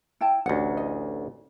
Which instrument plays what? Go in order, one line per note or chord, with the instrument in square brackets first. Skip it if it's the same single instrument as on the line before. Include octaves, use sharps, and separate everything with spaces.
[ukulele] E4 G5 A5
[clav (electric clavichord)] A1 D2 [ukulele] D#5 F#5
[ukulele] D#5